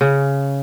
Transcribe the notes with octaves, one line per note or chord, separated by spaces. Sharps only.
C#3